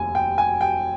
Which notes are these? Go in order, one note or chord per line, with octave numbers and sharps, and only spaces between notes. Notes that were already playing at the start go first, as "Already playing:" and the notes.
Already playing: F1 D#2 G#5
G5
G#5
G5